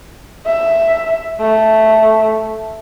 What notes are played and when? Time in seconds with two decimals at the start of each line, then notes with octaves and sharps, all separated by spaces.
0.46 E5
1.41 A3